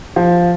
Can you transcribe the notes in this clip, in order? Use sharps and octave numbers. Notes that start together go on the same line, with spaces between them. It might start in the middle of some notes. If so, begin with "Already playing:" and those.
F3